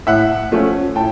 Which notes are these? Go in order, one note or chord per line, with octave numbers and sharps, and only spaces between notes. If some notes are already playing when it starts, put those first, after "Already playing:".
A2 E5 F#5
F3 A3 C#4
A2 G5 A5